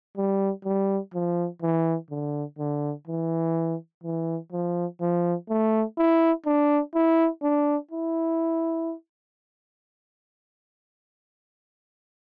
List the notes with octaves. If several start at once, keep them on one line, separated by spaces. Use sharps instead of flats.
G3
G3
F3
E3
D3
D3
E3
E3
F3
F3
A3
E4
D4
E4
D4
E4